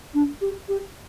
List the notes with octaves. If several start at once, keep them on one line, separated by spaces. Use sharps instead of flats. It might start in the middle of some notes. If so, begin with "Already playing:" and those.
D4
G4
G4